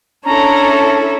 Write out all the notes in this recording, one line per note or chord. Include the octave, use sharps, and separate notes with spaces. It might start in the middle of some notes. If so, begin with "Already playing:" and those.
C#4 D4 E4 A4 A#5